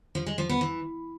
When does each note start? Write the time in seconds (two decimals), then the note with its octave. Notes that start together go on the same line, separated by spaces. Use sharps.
0.15 F3
0.26 G#3
0.38 F3
0.49 B3
0.61 E3